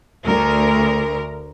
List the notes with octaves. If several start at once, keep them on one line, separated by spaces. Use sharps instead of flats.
D2 A#4